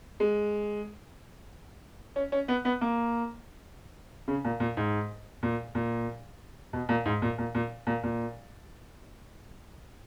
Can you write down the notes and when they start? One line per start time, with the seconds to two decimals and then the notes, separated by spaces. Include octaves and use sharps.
0.20 G#3
2.16 C#4
2.32 C#4
2.48 B3
2.65 B3
2.81 A#3
4.28 C#3
4.45 A#2
4.60 A#2
4.77 G#2
5.43 A#2
5.75 A#2
6.73 B2
6.89 A#2
7.05 G#2
7.22 A#2
7.38 A#2
7.55 A#2
7.87 A#2
8.03 A#2